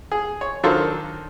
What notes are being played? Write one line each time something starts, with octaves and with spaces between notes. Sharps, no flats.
G#4
C#5
D#3 F#3 D4 F4 A4 C5